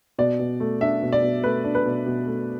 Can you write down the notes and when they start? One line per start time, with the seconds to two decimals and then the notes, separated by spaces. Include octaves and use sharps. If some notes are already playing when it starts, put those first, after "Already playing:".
0.18 B2 D5
0.39 B2
0.60 A3
0.81 D4 E5
1.02 B2
1.12 D5
1.23 B2
1.44 A3 B4
1.64 D4
1.75 B4
1.85 B2
2.06 B2
2.27 A3